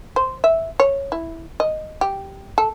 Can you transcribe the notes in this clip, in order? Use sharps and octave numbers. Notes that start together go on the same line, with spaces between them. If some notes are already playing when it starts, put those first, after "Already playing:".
C5
E5
C#5
E4
D#5
G4
A4